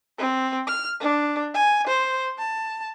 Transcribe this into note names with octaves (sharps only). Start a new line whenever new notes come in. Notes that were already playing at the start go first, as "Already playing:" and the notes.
C4
F6
D4
G#5
C5
A5